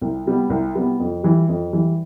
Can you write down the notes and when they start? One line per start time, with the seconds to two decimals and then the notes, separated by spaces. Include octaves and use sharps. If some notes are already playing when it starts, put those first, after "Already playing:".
0.01 C2
0.26 C3 G3 B3
0.50 C2
0.75 C3 G3 B3
1.00 F2
1.23 E3 G3
1.49 F2
1.73 E3 G3